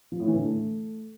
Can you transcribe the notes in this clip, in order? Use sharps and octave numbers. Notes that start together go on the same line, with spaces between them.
F3
A2
E3
D3
A3